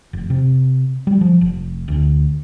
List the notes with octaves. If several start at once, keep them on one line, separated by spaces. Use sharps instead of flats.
F1
C3
G3
F3
F1
D2